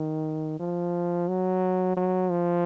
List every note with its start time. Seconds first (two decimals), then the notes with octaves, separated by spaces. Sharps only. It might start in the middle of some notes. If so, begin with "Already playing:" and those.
Already playing: D#3
0.60 F3
1.28 F#3
1.97 F#3
2.31 F3